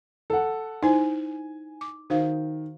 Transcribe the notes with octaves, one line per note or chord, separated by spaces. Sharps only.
A4 F#5
D#4 E4 C5 G#5
D6
D#3 F#4 C5 F5